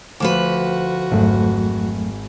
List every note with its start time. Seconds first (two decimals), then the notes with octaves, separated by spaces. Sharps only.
0.20 D2 F3 F#4 B4 D6
1.11 G#1 F2 F#3 A3